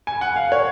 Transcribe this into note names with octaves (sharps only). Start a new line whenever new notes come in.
G#5
F#5
F5
C#5